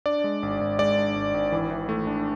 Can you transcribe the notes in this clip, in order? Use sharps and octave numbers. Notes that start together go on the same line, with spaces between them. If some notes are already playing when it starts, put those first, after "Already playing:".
D4 D5
G#3
G#1
G#1
G#3 D5
D4
G#1
G#1
E3
E3
A3
D4